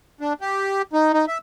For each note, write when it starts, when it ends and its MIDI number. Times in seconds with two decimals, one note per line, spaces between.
0.21 0.33 62
0.41 0.82 67
0.93 1.13 63
1.13 1.25 63
1.28 1.38 76